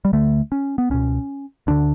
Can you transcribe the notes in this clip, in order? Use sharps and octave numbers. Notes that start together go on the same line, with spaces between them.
G3
D2 D3 A3
C#4
B3
C#2 B2 C#4
D2 D3 D4